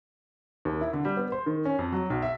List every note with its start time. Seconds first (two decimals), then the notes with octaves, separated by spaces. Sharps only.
0.65 D#2
0.81 E4
0.93 D3
1.05 G3
1.17 B3
1.32 C5
1.46 D#3
1.65 C#4
1.79 F2
1.92 F#3
2.10 B1
2.22 E5